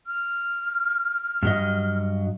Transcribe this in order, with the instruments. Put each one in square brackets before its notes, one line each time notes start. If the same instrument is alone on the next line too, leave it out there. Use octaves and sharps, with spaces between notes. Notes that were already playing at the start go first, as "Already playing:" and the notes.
[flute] F6
[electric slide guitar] G2 F#3 D#5